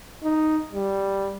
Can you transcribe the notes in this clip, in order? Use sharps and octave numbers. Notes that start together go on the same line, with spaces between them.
D#4
G3